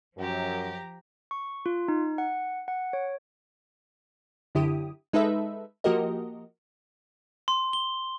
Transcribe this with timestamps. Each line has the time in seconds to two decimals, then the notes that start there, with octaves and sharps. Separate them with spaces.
0.17 F#2 F3 G4 A#5
1.31 C#6
1.66 F4
1.88 D#4
2.18 F#5
2.68 F#5
2.93 C#5
4.55 F#2 D3 E4 G4 D#6
5.13 G#3 D#4 A4 B4 E5
5.84 F3 A#3 F#4 G4 A#4 D#5
7.48 C6
7.73 G7